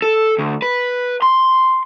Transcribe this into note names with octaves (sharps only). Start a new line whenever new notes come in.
A4
D2
B4
C6